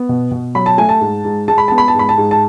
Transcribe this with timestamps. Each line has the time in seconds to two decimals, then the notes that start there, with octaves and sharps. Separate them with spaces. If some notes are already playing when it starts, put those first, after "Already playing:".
Already playing: B3
0.09 B2
0.31 B2
0.55 F#3 B5
0.66 A5
0.78 A3 G#5
0.89 A5
1.01 G#2
1.25 G#2
1.48 G#3 A5
1.58 B5
1.68 B3 A5
1.78 B5
1.88 A5
1.95 G#2 B5
2.09 A5
2.18 G#2
2.31 A5